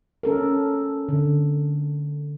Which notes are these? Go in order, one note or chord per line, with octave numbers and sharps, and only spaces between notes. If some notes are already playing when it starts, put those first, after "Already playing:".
C#4 A4 A#4
D3